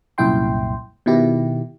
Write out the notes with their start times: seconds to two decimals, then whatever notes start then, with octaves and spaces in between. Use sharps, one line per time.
0.18 C2 F#2 A#2 E4 G5 C6
1.06 B2 D#3 E4 G4